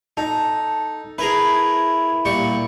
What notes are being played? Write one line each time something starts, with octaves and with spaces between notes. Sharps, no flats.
D#4 A4
E4 G#4 A#4 B4
A#2 G3 C#6